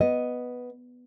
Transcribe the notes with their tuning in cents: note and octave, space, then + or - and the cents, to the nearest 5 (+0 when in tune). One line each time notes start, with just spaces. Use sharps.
B3 +0 D#5 +0